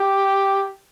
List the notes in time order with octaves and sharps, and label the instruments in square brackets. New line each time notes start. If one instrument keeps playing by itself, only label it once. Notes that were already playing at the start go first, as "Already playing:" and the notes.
Already playing: [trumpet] G4